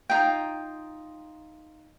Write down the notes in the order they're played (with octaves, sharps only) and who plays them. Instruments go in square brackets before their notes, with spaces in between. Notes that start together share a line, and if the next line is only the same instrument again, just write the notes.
[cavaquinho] D#4 F4 G5